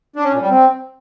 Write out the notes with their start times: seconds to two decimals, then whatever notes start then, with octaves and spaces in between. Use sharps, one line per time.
0.16 D4
0.24 C#4
0.33 A#2
0.41 G3
0.50 C4